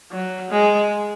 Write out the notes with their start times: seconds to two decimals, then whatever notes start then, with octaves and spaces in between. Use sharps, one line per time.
0.12 F#3
0.50 G#3